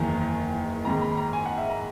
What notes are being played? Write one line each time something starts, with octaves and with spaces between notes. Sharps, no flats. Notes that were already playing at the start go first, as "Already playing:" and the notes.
Already playing: F#1 E2 D#3 A#5
A#1 G#2 D#3 A#5
B5
A#5
G#5
F#5
E5
A#5